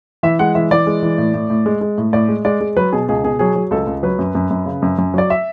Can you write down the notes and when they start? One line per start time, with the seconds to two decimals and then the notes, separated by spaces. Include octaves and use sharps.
0.23 E3 E5
0.39 G#3 F#5
0.55 E3 E5
0.71 E3 D5
0.87 G#3
1.03 E3
1.18 A2
1.34 A2
1.50 A2
1.66 G#3
1.81 G#3
1.98 A2
2.13 A2 D5
2.29 G#3
2.45 G#3 D5
2.60 G#3
2.77 F#3 B4
2.92 B2 G#4
3.09 C#2 G#4
3.24 B2 G#4
3.39 F#3 G#4
3.56 F#3
3.71 C#2 A4
3.87 C#2
4.03 F#3 B4
4.19 F#2
4.35 F#2
4.50 F#2
4.66 C#3
4.82 F#2
4.98 F#2
5.14 F#3 D5
5.30 E5